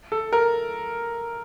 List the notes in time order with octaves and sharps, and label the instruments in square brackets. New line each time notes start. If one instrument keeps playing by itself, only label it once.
[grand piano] A4
A#4